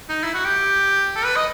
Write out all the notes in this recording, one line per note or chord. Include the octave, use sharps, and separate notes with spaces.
D#4
E4
F#4
G4
A4
B4
D#5